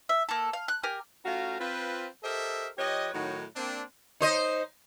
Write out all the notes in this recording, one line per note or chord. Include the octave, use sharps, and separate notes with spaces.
E5
A#3 A4
F5
F#6
G4 A#4 G#5
A3 C#4 F4 F#4 F5 A#5
C4 F4 B4
G4 A4 A#4 C5 D#5 E5
F3 G4 B4 C#5 D#5
A2 D#3 F#3 D#4 F#4 C#5
A#3 C4 D4
D#4 C5 D#5